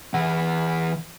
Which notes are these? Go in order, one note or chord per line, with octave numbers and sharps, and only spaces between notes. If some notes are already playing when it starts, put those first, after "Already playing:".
E3 F#5